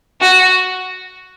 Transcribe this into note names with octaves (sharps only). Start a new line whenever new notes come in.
F#4